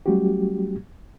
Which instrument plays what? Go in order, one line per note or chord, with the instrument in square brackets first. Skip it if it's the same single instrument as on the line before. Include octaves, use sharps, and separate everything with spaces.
[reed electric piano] F#3 G3 A3 C#4 F#4 G4